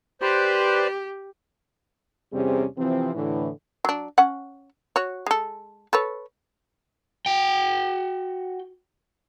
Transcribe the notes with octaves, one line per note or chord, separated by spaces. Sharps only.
G4 B4 C5 D5
E2 C3 G3 C4 C#4 G#4
C3 E3 F3 C4
A2 D3 E3
F#3 D4
C#4 F#5
F#4 C#5
G#3 A4
A4 B4 C#5
F#4 G5